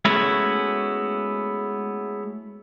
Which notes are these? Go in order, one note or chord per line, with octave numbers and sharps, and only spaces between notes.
G#3 A3 B3 C#4 E4 F#4